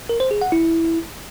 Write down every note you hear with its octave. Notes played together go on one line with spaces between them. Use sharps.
A#4
C5
G#4
F#5
E4